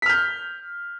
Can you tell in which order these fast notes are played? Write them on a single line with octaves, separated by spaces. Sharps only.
B6 F6 G6